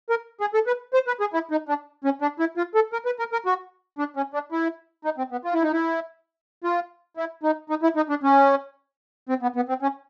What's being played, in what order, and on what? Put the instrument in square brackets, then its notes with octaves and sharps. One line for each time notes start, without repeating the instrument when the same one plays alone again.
[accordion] A#4
G#4
A4
B4
C5
B4
G#4
E4
D#4
D4
C#4
D4
E4
F4
A4
A#4
B4
A#4
A#4
F#4
D4
C#4
D4
E4
D#4
C4
B3
F4
E4
D#4
E4
F4
E4
D#4
D#4
E4
D#4
D4
C#4
C4
B3
B3
C4
C#4